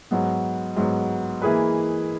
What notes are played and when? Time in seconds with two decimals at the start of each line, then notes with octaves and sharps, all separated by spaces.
0.11 G#2 F#3 B3
0.76 G#2 F#3 B3
1.42 E3 A#3 E4 G#4 B4